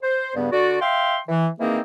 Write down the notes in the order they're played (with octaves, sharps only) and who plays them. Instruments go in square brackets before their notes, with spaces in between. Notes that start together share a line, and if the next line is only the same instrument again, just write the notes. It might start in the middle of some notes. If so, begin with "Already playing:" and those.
[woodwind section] C5
G2 C#3 B3
D3 F#4 D5
E5 F5 G5 C6
E3
D#3 E3 A#3 C4 D#4 G#4